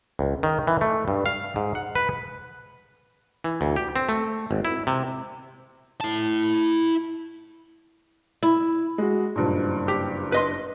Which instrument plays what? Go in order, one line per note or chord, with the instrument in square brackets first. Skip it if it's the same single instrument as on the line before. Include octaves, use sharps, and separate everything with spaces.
[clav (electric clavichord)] C#2
D#3
E3
A3
G2
F5
G#2
F#5
B4
E3
D2
G4
C4
A3
G#1
E4
C3
[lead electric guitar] E4 A5
[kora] E4
[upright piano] G#3 F#4
F#1 G2 A#2
[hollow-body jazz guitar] G4
B4 D#5 C6